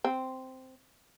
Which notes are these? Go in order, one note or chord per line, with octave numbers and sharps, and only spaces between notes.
C4